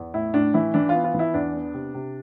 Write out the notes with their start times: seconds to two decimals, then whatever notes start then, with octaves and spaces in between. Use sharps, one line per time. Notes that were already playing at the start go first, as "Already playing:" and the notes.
Already playing: E2
0.14 A2 E4
0.34 A2 D4
0.54 E3 E4
0.74 E3 D4
0.89 F4
0.94 B3
1.04 F4
1.14 E3
1.19 E4
1.34 E2 D4
1.54 B3
1.74 C3
1.94 C3